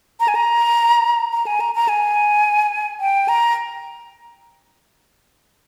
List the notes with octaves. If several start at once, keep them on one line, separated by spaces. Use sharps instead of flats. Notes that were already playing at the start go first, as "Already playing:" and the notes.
A#5
G#5
A#5
A#5
G#5
A#5
A#5
G#5
G5
A#5